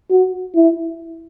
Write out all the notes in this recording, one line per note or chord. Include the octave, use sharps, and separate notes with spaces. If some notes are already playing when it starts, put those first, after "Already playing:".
F#4
E4